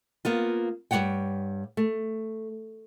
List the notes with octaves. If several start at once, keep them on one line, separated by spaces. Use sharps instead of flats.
A#3 B3 F4
G2 G3 C#5 F#5 G5
A3